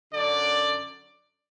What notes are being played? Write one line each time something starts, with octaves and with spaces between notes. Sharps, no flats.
F#2 D3 F#3 D5